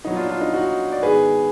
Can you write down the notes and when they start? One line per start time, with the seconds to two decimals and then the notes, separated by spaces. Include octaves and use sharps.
0.04 A#2 F#3 B3 D#4
0.16 D4 F4
0.29 D4 F4
0.41 D#4
0.53 D#4 F#4
0.92 D5
1.03 G#2 D#3 G#3 B3 G#4 B4